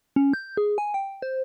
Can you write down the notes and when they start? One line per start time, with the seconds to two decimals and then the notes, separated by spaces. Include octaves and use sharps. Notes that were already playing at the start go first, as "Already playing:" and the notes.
0.16 C#4
0.33 G6
0.57 G#4
0.78 G#5
0.94 G5
1.22 C5